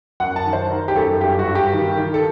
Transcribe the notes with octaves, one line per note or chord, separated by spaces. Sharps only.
F#2 F#5
A5
D#3
C5
D#3 A#4
G4
F#2 A4
G2 G4
F#4
G2
G4
D#3
D#3
A4